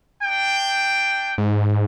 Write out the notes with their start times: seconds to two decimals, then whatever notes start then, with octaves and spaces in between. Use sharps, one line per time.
0.23 D4 G5
1.38 G#2